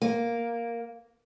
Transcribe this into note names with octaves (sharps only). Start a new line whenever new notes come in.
A#3